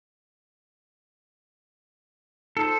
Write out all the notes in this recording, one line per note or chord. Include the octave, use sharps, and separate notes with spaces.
D#4 F4 A4 C5 E6